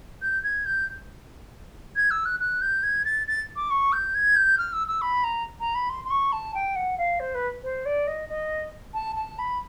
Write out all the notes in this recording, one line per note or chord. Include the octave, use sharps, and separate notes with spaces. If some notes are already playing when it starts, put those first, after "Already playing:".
G6
G#6
G6
G#6
E6
F#6
F#6
G6
G#6
A6
A6
D6
C#6
G6
G#6
G6
F6
E6
E6
B5
A#5
A#5
B5
C6
C6
C#6
A5
G5
F#5
F5
C5
B4
C5
D5
D#5
D#5
A5
A5
B5